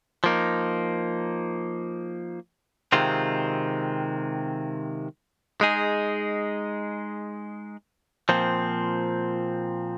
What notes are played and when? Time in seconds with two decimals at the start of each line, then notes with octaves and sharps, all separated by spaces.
0.24 F3 A#3 D#4
2.92 C3 D#3 G#3 C4 F4
5.61 G#3 D#4 G#4
8.29 A#2 F3 C4